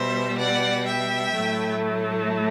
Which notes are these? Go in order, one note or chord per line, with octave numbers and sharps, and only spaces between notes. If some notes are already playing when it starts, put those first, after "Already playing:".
Already playing: B2 G3 C5 E5
D5 F#5
E5 G5
A2 F#3 A3